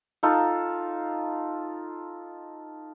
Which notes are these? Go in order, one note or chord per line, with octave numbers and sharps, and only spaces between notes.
D#4 F4 A4